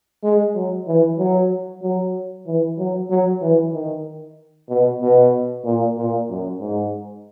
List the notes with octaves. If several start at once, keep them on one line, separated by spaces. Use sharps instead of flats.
G#3
F#3
E3
F#3
F#3
E3
F#3
F#3
E3
D#3
B2
B2
A#2
A#2
F#2
G#2